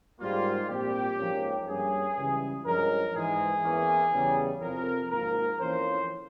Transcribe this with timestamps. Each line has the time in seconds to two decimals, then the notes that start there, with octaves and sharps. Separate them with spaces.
0.20 G#2 G3 A#3 F4
0.69 A#1 A#2 G3 C4 G4
1.18 G#2 F3 A#3 C#4
1.67 G2 G3 A#3 C#4 G#4
2.16 C#2 C#3 E3 G3
2.65 G2 F3 G#3 C#4 A#4
3.14 G#2 E3 G#3 G#4
3.63 E2 E3 A#3 C#4
4.13 E2 C#3 G3
4.62 F2 C3 F3 C4 A#4
5.11 G#1 G#2 F3 A#3 A#4
5.60 F2 E3 A#3 C#4 C5